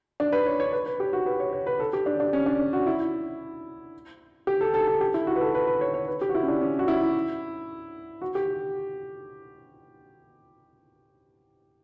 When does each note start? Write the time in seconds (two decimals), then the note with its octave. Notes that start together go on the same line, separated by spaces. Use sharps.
0.20 D4
0.32 B4
0.46 C#5
0.60 C#5
0.73 B4
0.86 B4
1.00 G4
1.13 F#4
1.26 B4
1.40 C#5
1.53 C#5
1.67 B4
1.80 A4
1.93 G4
2.06 D4
2.20 D4
2.33 C#4
2.46 D4
2.73 F#4
2.87 E4
4.47 G4
4.61 A4
4.74 A4
4.87 A4
5.01 G4
5.14 E4
5.27 F#4
5.36 B4
5.41 A4
5.55 B4
5.67 B4
5.81 C#5
5.94 C#5
6.08 B4
6.21 G4
6.29 F#4
6.35 E4
6.43 C#4
6.48 D4
6.62 C#4
6.79 F#4
6.88 E4
8.22 F#4
8.35 G4